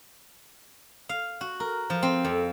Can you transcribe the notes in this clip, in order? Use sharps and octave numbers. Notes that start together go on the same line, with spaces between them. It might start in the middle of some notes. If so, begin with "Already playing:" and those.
F5
F#4
A#4
F3
C4
F2